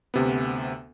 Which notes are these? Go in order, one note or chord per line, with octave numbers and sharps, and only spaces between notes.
D2 C3 B3